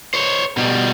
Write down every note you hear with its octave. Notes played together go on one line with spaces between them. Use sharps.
C5 C#5
B2 G3